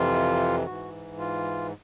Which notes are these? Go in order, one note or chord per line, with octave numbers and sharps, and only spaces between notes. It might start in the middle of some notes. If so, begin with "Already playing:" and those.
Already playing: F2 C3 E3 F4
G#2 E3 F#4
F4